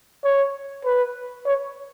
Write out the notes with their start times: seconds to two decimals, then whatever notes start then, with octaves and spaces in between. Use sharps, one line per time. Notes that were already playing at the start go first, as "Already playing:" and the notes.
0.24 C#5
0.85 B4
1.46 C#5